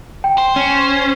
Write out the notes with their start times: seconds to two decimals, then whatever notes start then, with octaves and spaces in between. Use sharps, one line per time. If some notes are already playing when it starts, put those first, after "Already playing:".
0.24 G5
0.38 C5
0.56 C#4